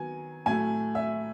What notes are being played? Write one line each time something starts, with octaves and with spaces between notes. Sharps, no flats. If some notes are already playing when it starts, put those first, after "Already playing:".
Already playing: D#3 F#3 B3 G#5
A2 F#3 A3 G#5
E5